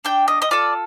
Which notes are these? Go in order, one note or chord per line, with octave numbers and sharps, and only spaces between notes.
D4 G5
D#5
D#5
F4 A4 D5